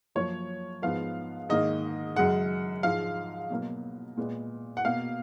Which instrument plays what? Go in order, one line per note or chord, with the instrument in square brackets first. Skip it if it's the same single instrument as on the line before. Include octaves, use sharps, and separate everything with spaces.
[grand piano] F#2 F3 A#3 C#5
G#2 F3 B3 F5
G#2 D#3 A#3 D#5
F#2 C#3 G#3 F#5
G#2 F3 G#3 F5
B2 F#3 A#3
A#2 G#3 B3
F#5
B2 A#3 F5